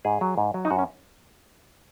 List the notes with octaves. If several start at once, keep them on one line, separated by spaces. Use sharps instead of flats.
G#2 G#4
F#3
G#2
F#3
D#4
F#2 F#4
C#4